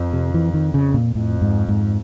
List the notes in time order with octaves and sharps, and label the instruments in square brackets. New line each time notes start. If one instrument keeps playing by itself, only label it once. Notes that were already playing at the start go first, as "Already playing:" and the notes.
Already playing: [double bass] F2
[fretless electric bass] C3
E3
D#3
C#3
A#2
[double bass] F2 [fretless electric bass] A2
[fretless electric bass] G#2
G#2